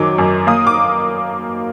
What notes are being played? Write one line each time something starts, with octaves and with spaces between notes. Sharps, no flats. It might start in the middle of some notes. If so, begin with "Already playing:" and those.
Already playing: F#2 D#3 F#3 D6
F#2
A#3 D#6
D6